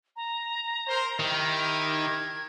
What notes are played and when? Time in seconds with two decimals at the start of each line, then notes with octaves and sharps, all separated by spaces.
0.16 A#5
0.87 A#4 C5
1.20 D#3 E4 G4 A#4
1.94 G#6